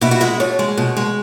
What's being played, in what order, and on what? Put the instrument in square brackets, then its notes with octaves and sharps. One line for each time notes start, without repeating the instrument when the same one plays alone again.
[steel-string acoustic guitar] B2 E4
F#4
G#3 E4
B2 C#5
G#3
B2
G#3